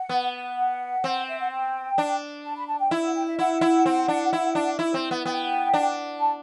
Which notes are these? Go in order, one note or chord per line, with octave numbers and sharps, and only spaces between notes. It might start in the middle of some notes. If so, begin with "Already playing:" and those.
Already playing: F#5
B3
F#5
C4
E5
F#5
G5
D4
A5
B5
A5
G5
E4
F#5
G5
E5
E4 F#5
E4
C4
D4
E4
D4
E4
C4
B3
B3 G5
D4
A5